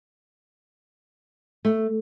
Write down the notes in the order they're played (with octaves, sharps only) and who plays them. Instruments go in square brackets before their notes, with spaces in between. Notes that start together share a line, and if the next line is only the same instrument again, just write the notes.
[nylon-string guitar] A3